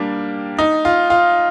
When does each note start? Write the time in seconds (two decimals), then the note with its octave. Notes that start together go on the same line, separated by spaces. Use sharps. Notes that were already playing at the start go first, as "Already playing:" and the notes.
Already playing: G3 A#3 D4
0.59 D#4
0.85 F4
1.10 F4